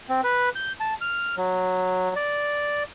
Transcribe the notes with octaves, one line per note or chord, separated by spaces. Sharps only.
C4
B4
G6
A5
F6
F#3
D5